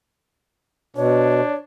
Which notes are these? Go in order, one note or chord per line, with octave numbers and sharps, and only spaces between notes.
B2 D4 C#5